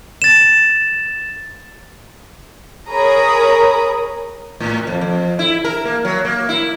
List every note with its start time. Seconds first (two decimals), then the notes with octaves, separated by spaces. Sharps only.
0.22 A6 E7
2.89 G#4 A#4 C#5 A#5 B5 D#6
4.60 A2
4.87 F2
5.01 F2
5.39 E4
5.64 A#4
5.85 A#3
6.05 F#3
6.25 A#3
6.49 E4